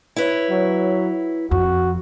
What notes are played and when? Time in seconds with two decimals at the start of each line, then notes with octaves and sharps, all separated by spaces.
0.16 E4 B4 C#5
0.50 F#3
1.51 F2 F#4